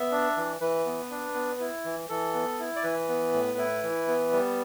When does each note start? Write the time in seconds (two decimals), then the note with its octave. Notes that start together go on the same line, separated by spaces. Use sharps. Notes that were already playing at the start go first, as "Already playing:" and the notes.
Already playing: B3 E5
0.12 D4
0.37 E3
0.61 E3 B4
0.86 B3
1.11 D4
1.35 B3
1.60 E4
1.84 E3
2.09 E3 A4
2.34 B3
2.59 E4
2.76 D5
2.83 E3 B4
3.09 B3
3.33 A2
3.58 E4
3.83 E3
4.07 B3
4.32 G3